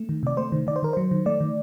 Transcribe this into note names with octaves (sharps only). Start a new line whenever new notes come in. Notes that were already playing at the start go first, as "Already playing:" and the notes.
Already playing: A3
D#3
C3 D5
A3 C5
D#3
D#3 D5
C5
D#3 A#4
F#3 C5
D#3
A3 D5
D#3